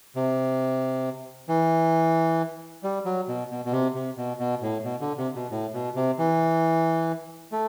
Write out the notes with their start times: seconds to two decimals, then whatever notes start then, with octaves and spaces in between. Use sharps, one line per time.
0.16 C3
1.49 E3
2.83 G3
3.05 F#3
3.28 B2
3.51 B2
3.65 B2
3.72 C3
3.95 C3
4.17 B2
4.39 B2
4.62 A2
4.84 B2
5.01 D3
5.18 C3
5.35 B2
5.51 A2
5.74 B2
5.96 C3
6.18 E3
7.52 A3